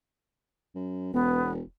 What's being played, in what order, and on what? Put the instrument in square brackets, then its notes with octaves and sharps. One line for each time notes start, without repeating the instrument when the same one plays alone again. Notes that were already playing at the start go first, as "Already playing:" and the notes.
[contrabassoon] F#2
[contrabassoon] E1 [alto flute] B3